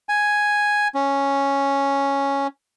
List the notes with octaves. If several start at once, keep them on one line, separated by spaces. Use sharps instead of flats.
G#5
C#4